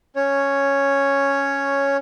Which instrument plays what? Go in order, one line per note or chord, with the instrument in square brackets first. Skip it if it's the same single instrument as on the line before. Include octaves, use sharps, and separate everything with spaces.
[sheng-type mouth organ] C#4 C#5